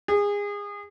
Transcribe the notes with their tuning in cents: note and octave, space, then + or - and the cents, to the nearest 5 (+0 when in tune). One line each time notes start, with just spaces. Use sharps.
G#4 -25